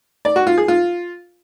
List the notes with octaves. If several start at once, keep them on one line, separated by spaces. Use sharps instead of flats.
D5
F#4
F4
G#4
F4